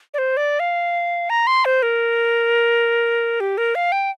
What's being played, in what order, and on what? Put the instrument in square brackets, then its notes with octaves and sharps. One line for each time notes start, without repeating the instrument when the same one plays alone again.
[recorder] D5
C5
D5
F5
A#5
C6
C5
A#4
G4
A#4
F5
G5